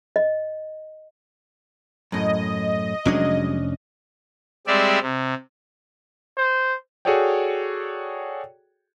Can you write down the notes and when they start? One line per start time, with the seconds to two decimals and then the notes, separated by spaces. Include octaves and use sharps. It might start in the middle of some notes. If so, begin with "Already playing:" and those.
0.16 D#5
2.12 F#2 A2 D#5
3.05 F1 F#3 G#3 C#4 D4
4.67 G3 G#3 C4 G4 D5 E5
5.02 C3
6.37 C5
7.05 F#4 G#4 A4 C#5 D5 G5